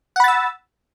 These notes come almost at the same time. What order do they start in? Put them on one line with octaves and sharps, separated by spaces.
F#5 B5 A6 E6